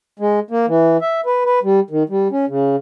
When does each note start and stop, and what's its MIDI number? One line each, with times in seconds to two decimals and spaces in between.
0.19 0.40 56
0.50 0.66 58
0.68 0.97 52
1.01 1.21 76
1.26 1.44 71
1.45 1.59 71
1.63 1.80 55
1.91 2.03 51
2.09 2.28 55
2.31 2.45 61
2.48 2.76 49